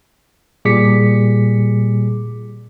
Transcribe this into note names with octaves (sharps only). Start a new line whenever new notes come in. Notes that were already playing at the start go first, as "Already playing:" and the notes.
A#2 G3 G#4 D6 B6 C#7